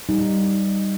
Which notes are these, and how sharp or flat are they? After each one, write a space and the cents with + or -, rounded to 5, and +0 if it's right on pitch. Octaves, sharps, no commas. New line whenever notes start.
G3 -5 D#4 +0